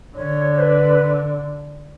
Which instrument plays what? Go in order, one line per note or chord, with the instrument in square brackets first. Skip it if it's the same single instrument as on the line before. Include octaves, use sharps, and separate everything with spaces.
[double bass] D3 [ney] C#5
[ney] C#5
B4